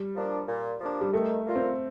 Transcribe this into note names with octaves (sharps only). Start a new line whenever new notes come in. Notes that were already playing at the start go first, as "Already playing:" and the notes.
Already playing: G3
F3 A#3 D4
A#2
F3 A#3 D4
G3
D#3 A3
A#3 D4 F4 A#4
C4